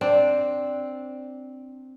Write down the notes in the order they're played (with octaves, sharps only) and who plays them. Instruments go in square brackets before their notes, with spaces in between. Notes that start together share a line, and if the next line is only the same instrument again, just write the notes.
[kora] C4 D4